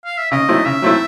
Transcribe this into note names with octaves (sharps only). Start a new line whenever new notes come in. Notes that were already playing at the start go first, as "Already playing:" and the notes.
F5
E5
C#3 D#5
F#3 A3 C4 E4
C#3 E5
F#3 A3 C4 E4